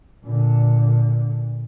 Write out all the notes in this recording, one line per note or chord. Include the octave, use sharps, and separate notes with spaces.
A#2 D3